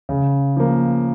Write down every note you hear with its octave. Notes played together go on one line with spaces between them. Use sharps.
C#3
F3 A#3